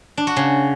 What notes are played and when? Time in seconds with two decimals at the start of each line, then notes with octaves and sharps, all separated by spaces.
0.17 D4
0.27 F#4
0.36 C#3